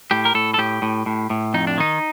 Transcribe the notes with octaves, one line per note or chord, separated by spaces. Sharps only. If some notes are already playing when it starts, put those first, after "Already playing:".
A2 G4
A#4
A2 A4
A4
A2 G4
A2
A2
A2
F2 D#4
D4
D#3 D#4